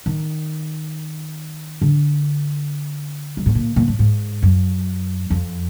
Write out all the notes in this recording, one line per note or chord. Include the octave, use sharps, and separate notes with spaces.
D#3
D3
G#2
A2
A#2
A#2
A2
G#2
F#2
F2